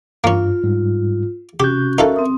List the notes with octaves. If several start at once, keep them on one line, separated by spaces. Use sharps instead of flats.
G2 A#3 C#4 F4
G#2 G3
C3 C#4 F#4 G4 G6
D#4 F4 A4 A#4 E5
C4 D#6